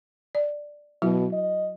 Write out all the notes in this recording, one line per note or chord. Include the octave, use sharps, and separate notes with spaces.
D5
B2 F#3 E4 F#4
D#5